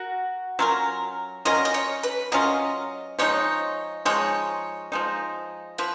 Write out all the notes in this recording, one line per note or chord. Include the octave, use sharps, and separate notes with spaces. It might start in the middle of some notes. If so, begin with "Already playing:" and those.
Already playing: F#4 A#4
F#3 C#4 F4 A#4
F#3 C#4 F4 A#4 D#5
D#5
C#5
B4
F#3 C#4 F4 A#4 D#5
F3 G#3 D#4 C#5
F3 G#3 D#4 C#5
F3 G#3 D#4
F3 B4